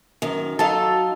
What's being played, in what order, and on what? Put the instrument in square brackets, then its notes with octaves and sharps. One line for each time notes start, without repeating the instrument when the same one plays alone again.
[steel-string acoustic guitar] F#2 D#3
[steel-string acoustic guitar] F#3 D#4 F4 [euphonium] F#4 [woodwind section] A4 [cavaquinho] A5